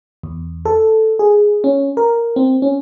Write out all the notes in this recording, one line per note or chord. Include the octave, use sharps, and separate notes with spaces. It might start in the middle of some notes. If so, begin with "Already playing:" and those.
E2
A4
G#4
C#4
A#4
C4
C#4